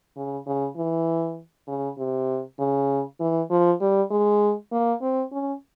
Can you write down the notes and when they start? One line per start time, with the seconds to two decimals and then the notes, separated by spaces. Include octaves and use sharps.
0.17 C#3
0.46 C#3
0.77 E3
1.68 C#3
1.98 C3
2.59 C#3
3.20 E3
3.50 F3
3.80 G3
4.11 G#3
4.72 A#3
5.02 C4
5.32 C#4